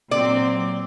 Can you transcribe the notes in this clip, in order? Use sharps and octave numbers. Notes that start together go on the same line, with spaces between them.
A#2 F#3 C4 D5